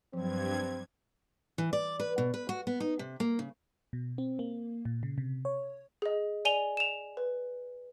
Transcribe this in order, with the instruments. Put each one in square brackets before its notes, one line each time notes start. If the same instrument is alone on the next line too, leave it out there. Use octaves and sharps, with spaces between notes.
[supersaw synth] G2 G#6 [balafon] F3 F#3 [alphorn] C4
[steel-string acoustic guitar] E3
D5
B4
B2
B4
F#4
B3
D#4
C3
A#3
C#3
[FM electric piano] B2
C4
A#3
A#2
C#3
C3
C#5
[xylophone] G#4 D#5
D5 G#5 D#7 F7 G7
E7 F7
B4